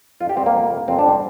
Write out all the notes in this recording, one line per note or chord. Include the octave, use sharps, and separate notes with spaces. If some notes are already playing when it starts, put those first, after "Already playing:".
F2 F4
G4
G3 C4
A#3
F2
C3
F2 C4
D4
G3 C4